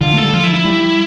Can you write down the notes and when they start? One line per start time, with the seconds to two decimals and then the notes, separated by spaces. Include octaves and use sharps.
0.01 D3 F4
0.13 A3 A4
0.23 G3
0.34 F3 F4
0.44 E4
0.54 E4
0.65 G3